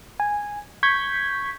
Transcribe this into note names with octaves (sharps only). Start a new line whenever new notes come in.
G#5
C#6 G6 G#6 B6